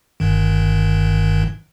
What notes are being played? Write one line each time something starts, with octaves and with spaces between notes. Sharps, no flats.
G1 G2 D#3